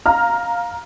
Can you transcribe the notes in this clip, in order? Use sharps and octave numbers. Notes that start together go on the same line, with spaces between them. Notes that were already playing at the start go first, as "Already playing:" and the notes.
F5 A#5 F6